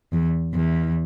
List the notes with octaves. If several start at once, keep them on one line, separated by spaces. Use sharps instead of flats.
E2
E2